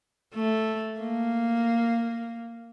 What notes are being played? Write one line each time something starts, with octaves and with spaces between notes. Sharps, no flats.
A3
A#3